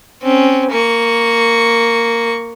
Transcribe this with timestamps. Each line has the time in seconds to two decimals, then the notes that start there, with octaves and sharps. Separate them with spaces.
0.23 C4 C#4
0.71 A#3 C#6